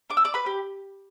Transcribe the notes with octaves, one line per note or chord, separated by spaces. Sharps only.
D4 D6
E6
D5 D6
B4 B5
G4